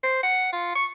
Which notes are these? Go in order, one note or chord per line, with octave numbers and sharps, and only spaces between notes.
C5
F#5
F4
C#6